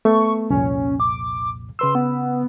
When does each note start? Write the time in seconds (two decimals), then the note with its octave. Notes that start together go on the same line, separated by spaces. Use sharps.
0.05 A3 B3 C#6
0.50 C2 F2 A#2 C#4
1.00 D6
1.79 C#3 B4 C6 E6
1.95 B3